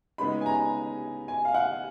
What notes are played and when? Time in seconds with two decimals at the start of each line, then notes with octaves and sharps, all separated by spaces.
0.18 C#3 G#3 B3 D#4 B5
0.41 G#5
0.46 A#5
1.28 G#5
1.45 F5
1.54 F#5